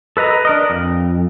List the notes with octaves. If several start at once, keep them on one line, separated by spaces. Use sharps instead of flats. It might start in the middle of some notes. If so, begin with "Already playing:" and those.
A4 B4 D#5 A#5
D4 A#4 D#5
F2